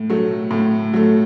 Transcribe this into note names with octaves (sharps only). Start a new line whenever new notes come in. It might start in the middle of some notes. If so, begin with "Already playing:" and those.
Already playing: A2
F#3 A3
A2
F#3 A3